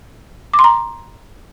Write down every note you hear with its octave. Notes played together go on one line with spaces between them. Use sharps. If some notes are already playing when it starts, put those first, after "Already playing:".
D6
C6
A#5